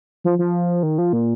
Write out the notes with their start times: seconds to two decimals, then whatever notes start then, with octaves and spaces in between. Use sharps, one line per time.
0.24 F3
0.39 F3
0.83 D#3
0.98 F3
1.13 A#2